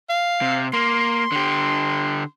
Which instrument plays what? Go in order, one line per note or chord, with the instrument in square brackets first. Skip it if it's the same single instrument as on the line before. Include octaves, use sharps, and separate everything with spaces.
[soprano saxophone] F5
[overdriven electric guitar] C3
[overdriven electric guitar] A#3 [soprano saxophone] C6
[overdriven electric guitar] D3 G4